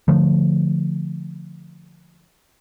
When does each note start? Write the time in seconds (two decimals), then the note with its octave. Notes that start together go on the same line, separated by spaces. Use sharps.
0.08 D3 F3 A3